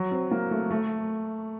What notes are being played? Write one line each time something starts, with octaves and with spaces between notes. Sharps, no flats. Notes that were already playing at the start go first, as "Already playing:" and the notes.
Already playing: F#3
C4
A#3
A3
A3